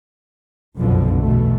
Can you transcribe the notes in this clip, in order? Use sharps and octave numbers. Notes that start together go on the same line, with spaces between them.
F1 B1 F#2 B2 D3 F3
E2 B2 A3